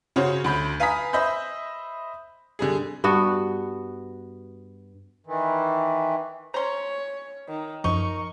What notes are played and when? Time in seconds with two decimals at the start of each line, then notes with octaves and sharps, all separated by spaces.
0.16 C#3 C#4 F#4 C5
0.44 D2 B5 G6
0.80 B4 F5 G#5 A#5 D#6 B6
1.13 C5 D#5 E5 B5 G6
2.59 D3 G3 G#4
3.04 G2 B3 F#4
5.26 D#3 E3
6.54 C#4 C5 C#5 A#5 C6
7.48 D#3
7.84 F#2 F3 D#4 A#4 C#6